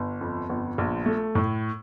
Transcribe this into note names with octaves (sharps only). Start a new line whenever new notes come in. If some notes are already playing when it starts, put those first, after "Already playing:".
Already playing: G1
F2
G1
A#1
A3
A2